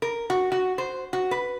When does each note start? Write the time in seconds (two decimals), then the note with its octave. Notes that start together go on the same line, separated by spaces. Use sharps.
0.02 A#4
0.30 F#4
0.52 F#4
0.78 C5
1.13 F#4
1.31 B4